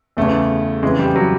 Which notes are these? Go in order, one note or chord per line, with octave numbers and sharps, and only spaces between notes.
E2 C#3 E3 A3
F2 C#3 E3 G#3
G3
F#3